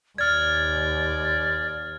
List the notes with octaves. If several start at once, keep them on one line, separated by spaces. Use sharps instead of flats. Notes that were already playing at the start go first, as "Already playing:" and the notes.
D#2 D5 F6 G#6